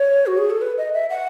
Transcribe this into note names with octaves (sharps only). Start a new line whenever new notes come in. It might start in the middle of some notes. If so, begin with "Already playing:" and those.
Already playing: C#5
F#4
G#4
A4
B4
D#5
E5
F#5